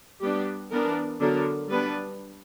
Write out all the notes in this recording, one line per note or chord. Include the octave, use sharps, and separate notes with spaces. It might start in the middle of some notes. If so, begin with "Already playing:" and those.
G3 B3 D4 G4
E3 B3 D4 A#4
D3 F#3 B3 D4 A#4
G3 B3 D4 B4